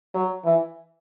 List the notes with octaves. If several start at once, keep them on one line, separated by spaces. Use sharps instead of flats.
F#3
E3